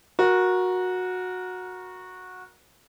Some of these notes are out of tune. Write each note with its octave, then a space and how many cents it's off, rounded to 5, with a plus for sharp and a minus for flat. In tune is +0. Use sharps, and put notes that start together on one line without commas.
F#4 -15 A#4 +15